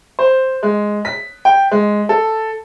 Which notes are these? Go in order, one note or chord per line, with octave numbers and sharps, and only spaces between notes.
C5
G#3
B6
G5
G#3
A4